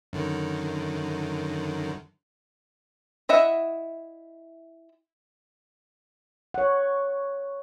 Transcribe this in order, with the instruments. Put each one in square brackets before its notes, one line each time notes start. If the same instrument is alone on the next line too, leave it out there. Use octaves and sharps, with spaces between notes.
[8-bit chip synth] F#2 D3 D#3
[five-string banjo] E4 D#5 E5 F#5
[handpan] C#5 F#5